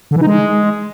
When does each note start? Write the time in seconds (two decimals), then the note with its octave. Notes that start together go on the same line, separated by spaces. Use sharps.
0.11 D3
0.16 E3
0.22 D#4
0.27 G#3